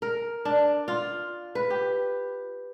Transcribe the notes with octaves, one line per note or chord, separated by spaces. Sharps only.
A#4
D4
F4
B4
G4